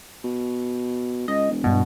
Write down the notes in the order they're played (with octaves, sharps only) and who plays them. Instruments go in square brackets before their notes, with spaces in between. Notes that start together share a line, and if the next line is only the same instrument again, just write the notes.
[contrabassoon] B2
[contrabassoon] C#2 [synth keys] D#5
[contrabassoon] E1
[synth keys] G2 B2